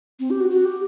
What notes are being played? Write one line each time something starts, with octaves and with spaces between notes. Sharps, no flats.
C4
G4
F#4
F#4
G4